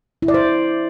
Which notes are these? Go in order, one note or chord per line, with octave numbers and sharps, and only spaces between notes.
E4
D5
C5